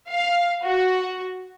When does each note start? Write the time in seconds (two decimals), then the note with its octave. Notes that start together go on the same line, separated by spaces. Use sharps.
0.10 F5
0.63 F#4